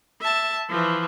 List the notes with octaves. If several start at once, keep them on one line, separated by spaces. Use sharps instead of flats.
E5 A5
E3 F3